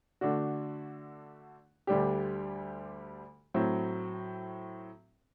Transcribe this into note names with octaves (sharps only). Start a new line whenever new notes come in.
D3 A3 D4 F#4
D2 D3 G3 D4 G4
A2 F#3 C4